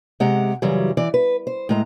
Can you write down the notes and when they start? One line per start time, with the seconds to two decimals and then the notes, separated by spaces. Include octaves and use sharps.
0.20 C3 G#3 G4 F#5 A#5
0.62 F#2 C#3 E3 F#3 G3
0.97 E3 D5
1.14 B4
1.47 C5
1.69 A2 G#3 A#5